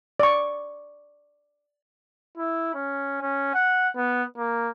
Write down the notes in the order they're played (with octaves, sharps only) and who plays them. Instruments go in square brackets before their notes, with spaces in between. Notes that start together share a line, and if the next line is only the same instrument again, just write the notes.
[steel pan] D5 C#6
[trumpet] E4
C#4
C#4
F#5
B3
A#3